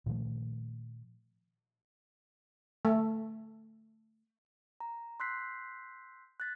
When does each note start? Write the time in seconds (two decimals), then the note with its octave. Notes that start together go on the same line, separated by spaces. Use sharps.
0.06 A#2 D#3 F3 A3
2.85 A3
4.80 A#5
5.20 C6 E6 F#6 G6 B6 C7
6.40 F#6 A6 B6